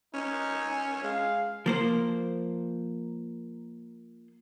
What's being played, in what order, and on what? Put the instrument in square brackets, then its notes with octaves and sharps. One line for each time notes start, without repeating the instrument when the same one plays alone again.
[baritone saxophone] C#4 [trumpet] D#4
[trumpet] G#5
[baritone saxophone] G#3 [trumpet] F5
[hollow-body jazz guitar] F3 A#3 C5